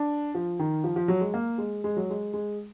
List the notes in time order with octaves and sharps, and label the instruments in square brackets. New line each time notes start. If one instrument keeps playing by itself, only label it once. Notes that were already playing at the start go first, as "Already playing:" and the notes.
Already playing: [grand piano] D4
F3
D#3
F3
F3
F#3
G#3
A#3
G#3
G#3
F#3
G#3
G#3